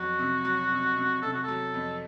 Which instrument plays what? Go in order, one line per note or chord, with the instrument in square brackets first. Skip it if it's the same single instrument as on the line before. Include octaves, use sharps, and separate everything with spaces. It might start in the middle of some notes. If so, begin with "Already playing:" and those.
Already playing: [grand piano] F2 F#3 [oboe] F#4
[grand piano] C3
F#3
C3
C3
[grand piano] C3 [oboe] A4
[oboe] F#4
[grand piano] F#3 [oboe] A4
[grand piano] F2